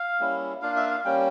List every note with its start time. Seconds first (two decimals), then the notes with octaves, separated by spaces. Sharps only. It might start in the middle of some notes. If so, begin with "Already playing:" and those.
Already playing: F5
0.20 G3 A#3 C#4 E4
0.62 A#3 D4 F4 F5
0.76 E5
0.91 F5
1.05 G3 A#3 C#4 G5